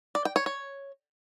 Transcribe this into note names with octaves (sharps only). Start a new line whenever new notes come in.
D5
G5
C#5
C#5